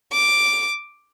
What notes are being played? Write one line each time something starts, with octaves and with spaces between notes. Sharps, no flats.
D6